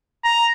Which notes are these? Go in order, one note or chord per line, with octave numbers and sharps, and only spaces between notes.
A#5